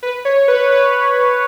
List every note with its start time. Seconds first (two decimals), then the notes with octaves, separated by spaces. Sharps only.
0.03 B4
0.25 C#5
0.48 B4
0.72 B4